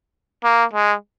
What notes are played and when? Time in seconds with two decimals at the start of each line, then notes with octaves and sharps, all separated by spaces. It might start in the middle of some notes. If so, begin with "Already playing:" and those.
0.44 A#3
0.73 G#3